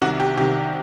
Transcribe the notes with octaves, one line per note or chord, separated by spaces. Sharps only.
C2 C3 D#3 F#4
G4
C2 C3 D#3 G4